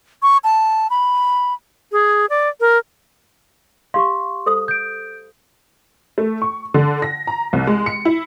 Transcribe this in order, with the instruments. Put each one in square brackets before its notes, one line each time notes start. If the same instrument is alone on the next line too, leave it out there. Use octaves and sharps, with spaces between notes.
[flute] C#6
A5
B5
G#4
D5
A#4
[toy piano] G4 F5 [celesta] C6 C#6
[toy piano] A4 C5 D#6
[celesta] G6 D7
[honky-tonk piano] A3
C#6
D3
A#6
A#5
C2
G#3
C#7
E4